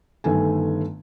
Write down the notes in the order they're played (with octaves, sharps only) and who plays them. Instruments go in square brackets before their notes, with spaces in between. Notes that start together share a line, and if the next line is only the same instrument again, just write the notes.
[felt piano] G1 D#3 A3 G#5